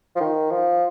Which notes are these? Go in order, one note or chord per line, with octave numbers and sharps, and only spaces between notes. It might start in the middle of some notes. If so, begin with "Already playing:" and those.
F3
D#3
F3